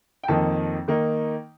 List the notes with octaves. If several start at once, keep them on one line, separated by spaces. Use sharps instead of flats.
G5
F2 D#3 A#3 D#4 A5
D#3 A#3 D#4